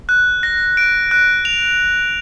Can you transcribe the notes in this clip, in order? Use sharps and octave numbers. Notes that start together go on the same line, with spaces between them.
F#6
A#6
D7
F#6
F7